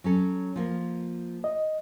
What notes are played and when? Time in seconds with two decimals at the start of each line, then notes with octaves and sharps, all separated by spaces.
0.04 F#3 C#4 A4
0.56 F3 A#3
1.44 D#5